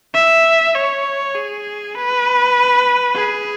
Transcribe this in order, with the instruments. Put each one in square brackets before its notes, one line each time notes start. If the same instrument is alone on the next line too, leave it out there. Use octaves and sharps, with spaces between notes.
[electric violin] E5
C#5
G#4
B4
G#4